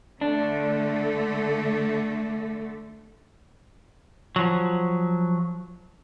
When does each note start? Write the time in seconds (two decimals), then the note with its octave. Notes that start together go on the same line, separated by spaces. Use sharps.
0.21 D3 A3 D4
4.36 F3 F#3